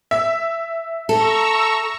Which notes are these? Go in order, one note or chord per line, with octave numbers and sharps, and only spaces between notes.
E5
A4 A#5 C#6 E6